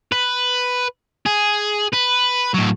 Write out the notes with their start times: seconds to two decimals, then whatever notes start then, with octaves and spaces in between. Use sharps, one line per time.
0.12 B4
1.26 G#4
1.93 B4
2.54 A2 F#3